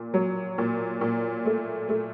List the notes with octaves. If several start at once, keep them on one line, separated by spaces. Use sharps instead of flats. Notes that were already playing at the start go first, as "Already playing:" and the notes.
Already playing: A#2
F#3
A#2
A#2
A3
A3